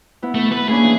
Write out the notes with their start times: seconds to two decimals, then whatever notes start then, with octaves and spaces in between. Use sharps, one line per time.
0.22 B3 E4
0.35 A3
0.52 B4
0.69 A#3 C#4 D4 G#4
0.84 E3